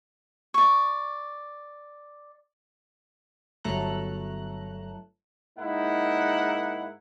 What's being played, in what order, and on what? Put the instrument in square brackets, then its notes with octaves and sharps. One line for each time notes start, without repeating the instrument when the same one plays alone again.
[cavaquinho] D5 C#6
[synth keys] G1 F#3 A3 A4 A#5 F#6
[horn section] G#2 A#3 D#4 E4 F#5